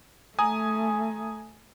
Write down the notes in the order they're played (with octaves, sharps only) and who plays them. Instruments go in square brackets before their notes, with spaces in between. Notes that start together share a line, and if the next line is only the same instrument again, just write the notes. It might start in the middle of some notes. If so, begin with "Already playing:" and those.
[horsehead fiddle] A3 [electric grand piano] G#5 A#5 D#6